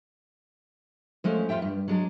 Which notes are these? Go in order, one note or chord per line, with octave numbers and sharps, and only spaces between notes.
F3 G#3 A3 C#4
F2 F4 E5 G5
G2
F#3 G#3 D4